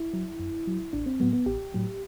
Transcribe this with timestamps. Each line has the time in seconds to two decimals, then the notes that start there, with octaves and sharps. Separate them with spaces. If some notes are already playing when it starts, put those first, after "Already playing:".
Already playing: E4
0.13 F#3
0.39 F#2
0.67 F#3
0.93 A1 D4
1.06 C4
1.20 A2 F#3 B3
1.33 B3
1.46 A1 G4
1.74 A2 F#3